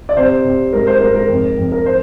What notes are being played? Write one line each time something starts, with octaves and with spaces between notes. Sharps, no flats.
D5
C3 C5
C3
G#2 A#4
C5
G#2 A#4
A#4
F2
F2
A#4
C5